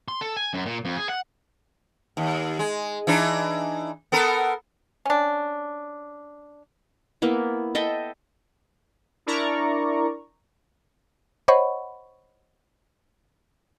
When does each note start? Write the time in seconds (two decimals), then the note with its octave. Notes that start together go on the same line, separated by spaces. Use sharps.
0.08 C6
0.21 A4
0.37 G#5
0.54 F#2
0.66 A#2
0.85 F2
0.97 G#4
1.09 F#5
2.17 D#2
2.59 G#3
3.07 E3 D4 D#4
4.12 B3 A4 A#4
5.05 C#4 D4
7.22 A#3 B3 E4
7.75 A4 D#5 E5 G5
9.26 D4 E4 A#4 D5 A#5 C#6
11.48 C5 C#5 D#5 F#5 B5 C#6